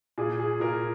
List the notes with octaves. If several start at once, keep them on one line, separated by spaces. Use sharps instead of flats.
A#2 G#4
G#4
A#2 A#4